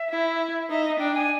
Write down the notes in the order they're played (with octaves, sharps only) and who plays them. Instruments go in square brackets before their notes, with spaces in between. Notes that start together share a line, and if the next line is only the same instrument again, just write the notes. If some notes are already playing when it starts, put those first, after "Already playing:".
Already playing: [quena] E5
[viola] E4
[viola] D#4 [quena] E5
[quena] D#5
[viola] D4 [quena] G5
[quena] G#5